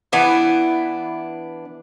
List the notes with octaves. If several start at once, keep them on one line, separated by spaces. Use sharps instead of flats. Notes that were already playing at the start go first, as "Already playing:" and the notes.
E3 B3 D4 E4